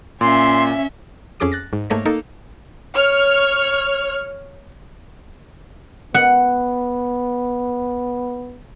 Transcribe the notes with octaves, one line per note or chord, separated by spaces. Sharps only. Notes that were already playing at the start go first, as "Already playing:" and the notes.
A#2 C#4 E5 C6
F2 C#4 G#4 A4 D6 D7
F#6 A6 A#6
G#2
G#2 A3 A#3 C#5 A#6
A#3 D#4 A4 A#4
C#5 F6
B3 F#5